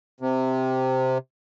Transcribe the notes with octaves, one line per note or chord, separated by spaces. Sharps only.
C3